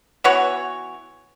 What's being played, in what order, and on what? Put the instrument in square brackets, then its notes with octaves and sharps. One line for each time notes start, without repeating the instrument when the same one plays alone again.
[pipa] E3 B3 F#4 C#5